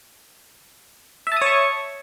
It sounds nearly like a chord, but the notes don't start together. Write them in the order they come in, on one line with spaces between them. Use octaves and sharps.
E5 A5 D#6 C#5 C#6